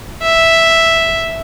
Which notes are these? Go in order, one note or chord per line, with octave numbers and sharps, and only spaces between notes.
E5